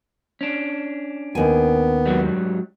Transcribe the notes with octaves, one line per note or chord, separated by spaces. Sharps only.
C#4 D4
D#2 B3 G#5
G#2 F#3 G3